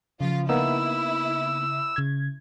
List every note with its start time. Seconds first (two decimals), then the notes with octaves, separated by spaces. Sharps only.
0.21 C#3 F3 F4
0.49 A#3 B3 D#4 E4 E6
1.96 C#3 G#6